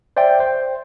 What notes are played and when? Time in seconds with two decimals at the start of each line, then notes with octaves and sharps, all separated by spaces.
0.17 C5 D5 E5 G5
0.40 C5